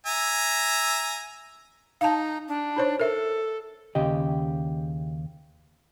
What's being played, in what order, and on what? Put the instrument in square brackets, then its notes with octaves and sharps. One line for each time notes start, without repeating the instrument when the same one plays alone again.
[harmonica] E5 G#5 A#5
[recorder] D#4 [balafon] F5 A5
[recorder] D4
[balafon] D#4 C5 C#5
[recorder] A4 [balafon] A#4 E5
[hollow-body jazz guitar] D#2 C#3 G4 D#5